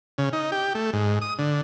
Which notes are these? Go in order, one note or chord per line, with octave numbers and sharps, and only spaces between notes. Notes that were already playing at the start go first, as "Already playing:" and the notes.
C#3
D#4
G4
A3
G#2
D#6
D3